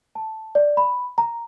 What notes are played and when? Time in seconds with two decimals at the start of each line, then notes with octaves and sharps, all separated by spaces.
0.15 A5
0.55 D5
0.77 B5
1.18 A#5